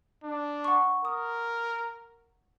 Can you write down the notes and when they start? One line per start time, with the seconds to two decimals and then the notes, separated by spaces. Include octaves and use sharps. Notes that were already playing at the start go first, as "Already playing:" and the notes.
0.23 D4
0.64 F#5 C#6
1.05 A#4 D#6